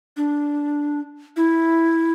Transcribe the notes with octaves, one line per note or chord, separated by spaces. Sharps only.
D4
E4